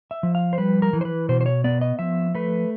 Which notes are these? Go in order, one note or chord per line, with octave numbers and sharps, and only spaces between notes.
E5
F3
F5
C5
G3 B4
A#4
E3
C5
B4
B2 C5
C5
C#5
B3 D5
D#5
F3 E5
A3 B4